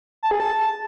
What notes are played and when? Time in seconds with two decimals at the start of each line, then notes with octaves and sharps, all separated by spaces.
0.23 A5
0.31 G#4
0.40 A5